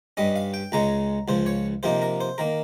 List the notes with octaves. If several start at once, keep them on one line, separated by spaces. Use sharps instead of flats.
G2 G3 C#4 D#5
F5
G5
C#2 C#3 G#3 C#4 A#5
C#2 C#3 F3 C5
C#5
C3 F3 A#3 D#4 C5
A#4
C5
D#3 A#3 A#4